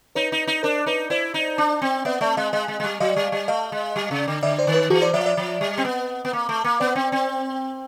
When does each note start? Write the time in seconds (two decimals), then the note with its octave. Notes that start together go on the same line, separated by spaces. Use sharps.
0.15 D#4 B4 C#5
0.32 D#4
0.47 D#4
0.63 D4 A#4 C5
0.86 D#4 B4 C#5
1.10 E4 C5 D5
1.34 D#4
1.58 D4
1.82 C4
2.05 B3 D5 E5
2.21 A3 D5 E5
2.37 G#3 D#5 F5
2.53 G#3 D#5 F5
2.68 G#3
2.80 G#3
2.84 G3
3.00 F#3 D#5 F5
3.16 G3
3.32 G3
3.48 A3 D#5 F5
3.72 G#3
3.96 G3
4.11 C#3
4.28 D3
4.43 D3 D5 E5
4.58 C5 D5
4.67 D#3
4.74 B4 C#5
4.90 E3 F#4 G#4
5.02 C5 D5
5.13 F3 D5 E5
5.21 F5
5.26 D5 E5
5.37 F3
5.61 G3
5.78 C4
5.85 B3
6.25 B3
6.33 A#3
6.49 A3
6.64 A#3
6.80 B3 C5 D5
6.95 C4
7.12 C4